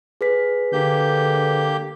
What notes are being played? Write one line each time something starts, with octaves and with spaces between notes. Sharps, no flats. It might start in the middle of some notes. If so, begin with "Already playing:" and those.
G#4 B4 B6
D3 A#3 G4 G6